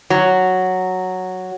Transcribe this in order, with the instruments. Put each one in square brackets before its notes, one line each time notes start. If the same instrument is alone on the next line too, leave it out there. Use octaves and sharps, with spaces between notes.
[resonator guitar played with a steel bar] F#3